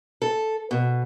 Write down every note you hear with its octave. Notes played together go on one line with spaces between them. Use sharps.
A4
B2